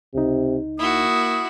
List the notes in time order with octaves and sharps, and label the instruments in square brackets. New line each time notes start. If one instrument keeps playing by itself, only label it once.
[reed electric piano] C#2 D#4 [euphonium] C3
[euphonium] A#3 [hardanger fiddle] E4 F#4 [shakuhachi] D#6